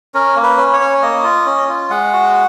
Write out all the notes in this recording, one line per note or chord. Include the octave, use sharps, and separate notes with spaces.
C#4 A#4
A#3
B4
C#4
C#5
C#4
A#3 D#5
F4
C#4
F4
G#3 F#5
F#4